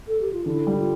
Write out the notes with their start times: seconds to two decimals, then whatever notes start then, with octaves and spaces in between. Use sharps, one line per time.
0.08 A4
0.21 G4
0.33 F4
0.46 D3 E4
0.67 G3
0.78 F4